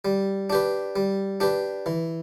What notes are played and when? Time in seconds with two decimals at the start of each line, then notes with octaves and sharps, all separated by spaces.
0.05 G3
0.50 D4 G4 B4
0.96 G3
1.40 D4 G4 B4
1.86 E3